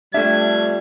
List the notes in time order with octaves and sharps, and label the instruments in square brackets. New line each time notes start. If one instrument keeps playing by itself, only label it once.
[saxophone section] F2 G3 [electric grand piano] A3 D4 [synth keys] E5 [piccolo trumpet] G#6